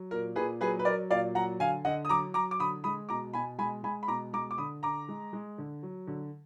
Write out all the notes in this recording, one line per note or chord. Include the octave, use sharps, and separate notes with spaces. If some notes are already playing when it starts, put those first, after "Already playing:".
Already playing: F#3
A#2 A#4
A#2 G#4 B4
F#3 G#4 B4
B4
F#3 A#4 D5
A#2 D5 F5
F#3 F#5 A#5
D3 F5 G#5
D3 D#5 F#5
D#6
F#3 A#5 D6
F#3 A#5 D6
D6
D3 B5 D#6
G#3 B5 D#6
B2 A#5 D6
B2 G#5 B5
G#3 G#5 B5
G#3 G#5 B5
B5
B2 A#5 D6
G#3 A#5 D6
D6
D3 B5 D#6
D3 A#5 D6
G#3
G#3
D3
F#3
D3